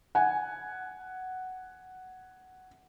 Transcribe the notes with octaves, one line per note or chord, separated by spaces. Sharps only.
F#5 G#5